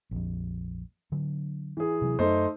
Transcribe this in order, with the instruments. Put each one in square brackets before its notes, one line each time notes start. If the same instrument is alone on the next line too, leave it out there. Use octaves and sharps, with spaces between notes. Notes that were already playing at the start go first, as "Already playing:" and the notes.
[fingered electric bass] A#1 F2
D3 F#3
[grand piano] E3 G#4
[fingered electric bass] C3 F#3
[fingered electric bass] F#2 [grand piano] A3 D#4 C5